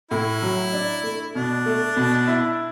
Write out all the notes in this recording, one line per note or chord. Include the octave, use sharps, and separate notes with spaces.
A2 E4
F#3
D4
A3
B2 D4
A3
B2
E4